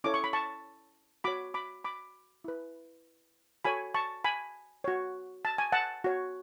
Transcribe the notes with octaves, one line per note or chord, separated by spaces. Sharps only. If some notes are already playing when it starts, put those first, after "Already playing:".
C#4 E4 A4 C#5 D6
C#6
B5
A5 C#6
F#4 C#5 B5 D6
B5 D6
B5 D6
E4 B4
F#4 A4 C#5 G#5 B5
A5 C#6
G#5 B5
F#4 C#5
A5
G#5
F#5 A5
F#4 C#5